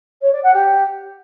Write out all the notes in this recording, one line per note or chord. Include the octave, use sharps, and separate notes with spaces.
C#5
D5
F#5
G4